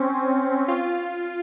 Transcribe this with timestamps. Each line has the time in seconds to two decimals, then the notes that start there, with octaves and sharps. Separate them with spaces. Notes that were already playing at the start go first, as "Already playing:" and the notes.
Already playing: C4 C#4
0.68 F4